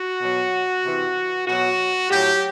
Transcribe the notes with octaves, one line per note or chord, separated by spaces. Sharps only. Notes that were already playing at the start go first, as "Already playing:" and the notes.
Already playing: F#4
B2 F#3
C3 E3
B2 F#3 F#4
A2 F#3 G4